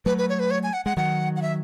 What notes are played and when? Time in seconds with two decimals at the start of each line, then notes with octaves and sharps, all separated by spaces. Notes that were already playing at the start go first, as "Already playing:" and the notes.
0.06 F#3 A3 B4
0.18 B4
0.29 C#5
0.39 B4
0.51 C#5
0.63 G#5
0.73 F#5
0.85 G#3 F#5
0.97 D#3 F#3 F#5
1.36 F#5
1.42 E5